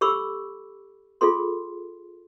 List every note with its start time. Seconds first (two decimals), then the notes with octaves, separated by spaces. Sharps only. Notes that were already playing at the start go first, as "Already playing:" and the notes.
0.01 G4 A4 B5 C#6 D6 E6
1.21 F4 G#4 A4 C6